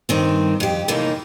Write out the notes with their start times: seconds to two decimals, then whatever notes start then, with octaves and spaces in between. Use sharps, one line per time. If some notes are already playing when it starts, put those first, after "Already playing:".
0.09 G2 D#3 C4
0.60 F2 G4
0.88 D#2 C3 E3 A3 A#3 D#4